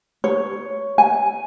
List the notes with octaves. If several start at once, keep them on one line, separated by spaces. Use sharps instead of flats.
C#5
G#5